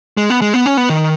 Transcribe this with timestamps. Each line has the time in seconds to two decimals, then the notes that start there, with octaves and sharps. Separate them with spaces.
0.17 G#3
0.30 B3
0.42 G#3
0.54 B3
0.66 C#4
0.77 B3
0.89 D#3